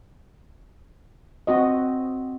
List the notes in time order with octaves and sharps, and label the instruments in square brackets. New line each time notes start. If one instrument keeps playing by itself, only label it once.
[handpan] C4 F#4 D#5